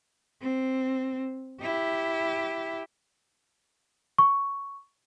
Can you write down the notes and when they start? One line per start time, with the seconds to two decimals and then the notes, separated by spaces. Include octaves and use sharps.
0.42 C4
1.61 E4 G4
4.18 C#6